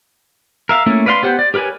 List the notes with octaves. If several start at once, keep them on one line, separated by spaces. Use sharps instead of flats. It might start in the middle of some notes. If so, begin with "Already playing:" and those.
A#4 E5 F5
A3 A#3 C#4 E4
B4 D5 F5 F#5 C6
B3 G4 C5 F#5
D5
G4 A#4 B4 C#5 G#5